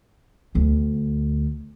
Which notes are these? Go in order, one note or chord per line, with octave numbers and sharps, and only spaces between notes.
D2 B3